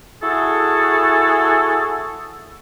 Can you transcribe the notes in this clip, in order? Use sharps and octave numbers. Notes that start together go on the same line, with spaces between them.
E4 F#4 G#4 A4